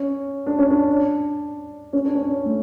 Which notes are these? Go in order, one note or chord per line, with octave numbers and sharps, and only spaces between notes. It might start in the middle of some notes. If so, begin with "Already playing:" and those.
Already playing: C#4
D4
C#4
D4
C#4
D4
C#4
A3